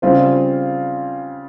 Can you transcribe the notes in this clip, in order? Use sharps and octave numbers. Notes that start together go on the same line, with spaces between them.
C#3 G3 C4 F4 C5